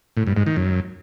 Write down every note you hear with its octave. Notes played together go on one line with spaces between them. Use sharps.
A2
G2
G#2
D#3
F#2